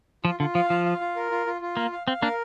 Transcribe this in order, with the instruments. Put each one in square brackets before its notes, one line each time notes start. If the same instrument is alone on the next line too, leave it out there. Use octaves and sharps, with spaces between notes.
[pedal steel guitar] F3 [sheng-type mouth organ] F4
[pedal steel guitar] D3 [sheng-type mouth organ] F4
[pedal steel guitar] F3 [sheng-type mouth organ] F5
[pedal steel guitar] F3 [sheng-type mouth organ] F4
[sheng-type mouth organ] F5
F4
A#4
F4
F4
F4
[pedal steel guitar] A#3 [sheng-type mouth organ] F5
[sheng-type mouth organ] F5
[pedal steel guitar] C4 [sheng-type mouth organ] F5
[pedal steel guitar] A#3 D4 [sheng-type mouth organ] A#4